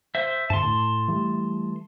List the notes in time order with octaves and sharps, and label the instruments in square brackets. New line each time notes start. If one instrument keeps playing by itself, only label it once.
[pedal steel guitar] C5 E5
[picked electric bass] G2 D3 [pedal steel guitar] A5 C6
[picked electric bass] A2
E3 G3 A3